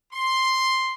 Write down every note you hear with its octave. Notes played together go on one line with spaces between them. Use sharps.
C6